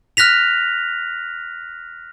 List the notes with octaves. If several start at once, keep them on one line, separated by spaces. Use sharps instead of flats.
F6 F#6 A#6 B6 F7